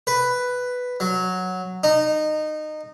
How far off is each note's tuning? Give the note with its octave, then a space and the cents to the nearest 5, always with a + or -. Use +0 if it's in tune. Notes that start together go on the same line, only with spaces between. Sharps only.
B4 +5
F#3 -5
D#4 -20